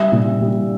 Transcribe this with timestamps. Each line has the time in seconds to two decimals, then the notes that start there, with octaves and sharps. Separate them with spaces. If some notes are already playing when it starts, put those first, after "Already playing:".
Already playing: G3 E5
0.12 A#2
0.41 G3